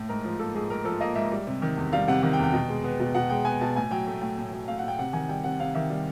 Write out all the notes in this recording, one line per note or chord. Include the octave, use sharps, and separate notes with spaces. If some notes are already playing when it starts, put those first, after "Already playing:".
Already playing: A2
G#2 A#4
F3
A#3 A4
G#2 G#4
G#2 A#4
F3 A4
A#3 D#5
G#2 E5
G3
C3
D#3
E2
G3 F5
C3 F#5
D#3 F#5
G5
E2
G5
B2
G#3
B3
B2
B2 F#5
G#3 G5
B3 G#5
B2 A5
A2 G#5
F#3 G5
A3
A2 G5
A2
F#3
A3 F5
F#5
A2
G5
C3 F#5
D#3 G#5
G3 G5
C3 F#5
C3 F5
D#3 E5
G3